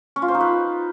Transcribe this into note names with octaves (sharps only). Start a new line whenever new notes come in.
C#4
F4
C5
D#4
B4